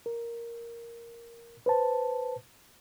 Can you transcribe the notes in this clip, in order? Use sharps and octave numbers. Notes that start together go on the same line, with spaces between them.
A#4
B4 C5 A5